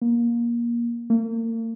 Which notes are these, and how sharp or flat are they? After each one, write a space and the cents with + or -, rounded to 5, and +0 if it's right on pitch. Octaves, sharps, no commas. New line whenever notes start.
A#3 +20
A#3 -45